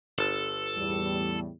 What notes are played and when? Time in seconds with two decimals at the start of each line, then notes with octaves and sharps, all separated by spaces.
0.19 G1 A4 A5
0.76 E2 A2 G3